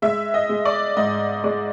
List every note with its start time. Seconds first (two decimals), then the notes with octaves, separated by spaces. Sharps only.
0.02 G#3 E5
0.34 D#5
0.49 G#3
0.65 D5
0.97 G#2 D#5
1.44 G#3 D5